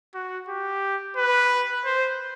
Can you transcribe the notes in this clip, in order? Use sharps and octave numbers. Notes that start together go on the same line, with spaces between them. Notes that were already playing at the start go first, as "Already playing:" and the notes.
F#4
G4
B4
C5